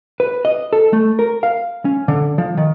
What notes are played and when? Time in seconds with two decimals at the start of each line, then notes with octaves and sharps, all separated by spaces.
0.20 B4
0.45 D#5
0.73 A4
0.93 A3
1.19 A#4
1.43 F5
1.85 C#4
2.08 D3
2.38 F3
2.57 D#3